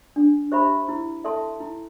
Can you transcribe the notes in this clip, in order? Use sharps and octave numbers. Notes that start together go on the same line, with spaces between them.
D4
G4 C5 E5 B5
E4
A4 E5 A5 C6
E4